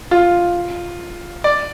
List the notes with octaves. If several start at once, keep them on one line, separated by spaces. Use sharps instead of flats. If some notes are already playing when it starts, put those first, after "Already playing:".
F4
D5